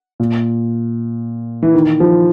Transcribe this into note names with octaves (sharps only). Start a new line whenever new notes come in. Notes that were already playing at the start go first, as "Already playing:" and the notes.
A#2
E3
D#3
F3